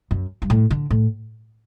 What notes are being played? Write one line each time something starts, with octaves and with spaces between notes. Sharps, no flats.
F#2
G2
A2
D3
A2